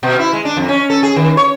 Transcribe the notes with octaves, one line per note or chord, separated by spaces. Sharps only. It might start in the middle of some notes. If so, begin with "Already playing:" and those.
B2
E4
G#3
D4
F2
C#4
A4
G#4
D#3
C#5